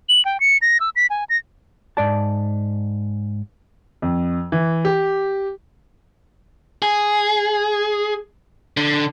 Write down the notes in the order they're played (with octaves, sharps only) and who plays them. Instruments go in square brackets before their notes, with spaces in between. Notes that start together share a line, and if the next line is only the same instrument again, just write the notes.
[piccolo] F#7
G5
C#7
A#6
E6
B6
G#5
A#6
[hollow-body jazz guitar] G#2 D5 A5
[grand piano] F2
E3
G4
[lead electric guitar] G#4
D3